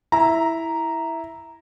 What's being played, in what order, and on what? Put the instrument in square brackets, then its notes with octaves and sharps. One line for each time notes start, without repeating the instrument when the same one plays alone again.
[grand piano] E4 A#5